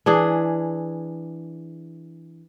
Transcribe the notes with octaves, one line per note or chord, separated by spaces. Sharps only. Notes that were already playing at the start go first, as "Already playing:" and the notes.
E3 D4 G#4